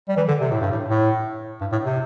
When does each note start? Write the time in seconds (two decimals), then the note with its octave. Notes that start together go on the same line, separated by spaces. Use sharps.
0.09 G3
0.17 E3
0.28 D3
0.40 C3
0.51 A2
0.61 G2
0.72 A2
0.89 A2
1.61 G2
1.72 A2
1.85 C3